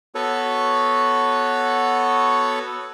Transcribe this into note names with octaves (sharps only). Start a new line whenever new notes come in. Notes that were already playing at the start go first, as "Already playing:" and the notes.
B3 F#4 A4 B4 C#5